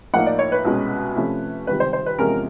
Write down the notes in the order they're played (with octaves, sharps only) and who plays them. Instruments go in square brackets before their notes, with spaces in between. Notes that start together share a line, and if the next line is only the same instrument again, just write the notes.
[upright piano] A2 F3 A#3 D#4 F#5
D5
C#5
B4
C2 B2 G#3 C#4
C3 F3 A3 C#4
C#2 C3 D#3 G3 B4
C5
C5
B4
E2 C3 F3 G#3 C#4 A#4